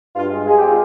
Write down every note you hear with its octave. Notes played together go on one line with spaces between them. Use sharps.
G2 F4
G#3
G#3 G#4
G4
C4 F4